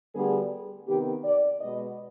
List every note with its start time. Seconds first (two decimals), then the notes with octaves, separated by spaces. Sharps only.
0.14 D2 D3 G3 B3 G#4
0.87 C3 D#3 B3 G4
1.24 D5
1.61 B2 G#3 B3 D#5